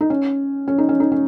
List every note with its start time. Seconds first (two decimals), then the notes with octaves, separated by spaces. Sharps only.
0.01 D#4
0.10 C#4
0.68 C#4
0.78 D#4
0.89 C#4
1.00 D#4
1.12 C#4